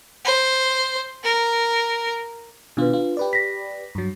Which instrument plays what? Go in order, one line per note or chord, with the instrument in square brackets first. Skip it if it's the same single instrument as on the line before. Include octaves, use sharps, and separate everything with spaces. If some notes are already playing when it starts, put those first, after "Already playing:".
[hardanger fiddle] C5
A#4
[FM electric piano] B2 D#3 F4 [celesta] D4 B4
[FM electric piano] F4
G4 B4 D5
[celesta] A#6 B6
[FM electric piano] G2 F#3